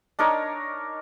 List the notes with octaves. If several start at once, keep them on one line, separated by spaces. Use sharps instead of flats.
D4 D#4 A#4 C#5